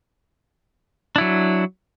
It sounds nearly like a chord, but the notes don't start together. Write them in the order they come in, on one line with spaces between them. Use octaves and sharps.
D4 E4 F#3